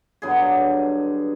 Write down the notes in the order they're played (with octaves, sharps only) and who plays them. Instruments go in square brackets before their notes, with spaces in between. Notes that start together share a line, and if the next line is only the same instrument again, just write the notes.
[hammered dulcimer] G2 D3 F#3 B3 G#4